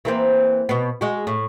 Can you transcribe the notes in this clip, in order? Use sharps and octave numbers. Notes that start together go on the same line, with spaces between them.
E3 A#3 C4
B2 B3
G#3 F#4
A2